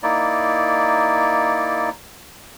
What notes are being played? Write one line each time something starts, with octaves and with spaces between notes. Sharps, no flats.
A#3 D#4 E4 D5